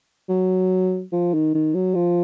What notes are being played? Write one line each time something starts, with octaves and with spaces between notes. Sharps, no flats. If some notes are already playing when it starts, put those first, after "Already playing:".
F#3
F3
D#3
D#3
F#3
F3